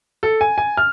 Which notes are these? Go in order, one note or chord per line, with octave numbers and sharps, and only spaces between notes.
A4
G#5
G#5
F6